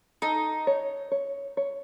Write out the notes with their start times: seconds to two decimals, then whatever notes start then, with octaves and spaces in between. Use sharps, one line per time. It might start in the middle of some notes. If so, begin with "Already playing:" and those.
0.22 D#4 A4
0.67 C#5
1.12 C#5
1.57 C#5